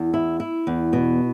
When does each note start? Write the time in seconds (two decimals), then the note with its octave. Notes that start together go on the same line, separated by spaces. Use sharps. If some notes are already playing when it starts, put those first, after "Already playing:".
Already playing: E2
0.14 E4
0.40 E4
0.67 E2
0.93 B2